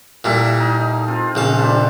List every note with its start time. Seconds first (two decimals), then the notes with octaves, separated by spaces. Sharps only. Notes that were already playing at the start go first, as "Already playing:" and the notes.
0.24 A#2 E3 G3 A4 E5
0.60 D#4
1.08 C4 F4
1.35 A#1 C#3 A5
1.59 G3 D4 C5